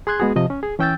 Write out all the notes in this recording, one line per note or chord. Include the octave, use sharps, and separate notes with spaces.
G#4 C6 F#6 G#6
G#3 B3 F#4 G#4
C3 F3 D#5
C#4
G#4
E3 C#4 G5 E6 G6 A6